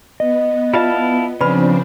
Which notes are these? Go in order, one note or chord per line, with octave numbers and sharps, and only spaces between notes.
B3 D#5
E4 F4 D5 F5 A5
C#3 F3 C4 D4 B4 D5 B5